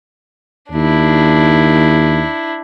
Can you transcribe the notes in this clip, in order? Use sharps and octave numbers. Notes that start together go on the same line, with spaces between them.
D#2 D4 E4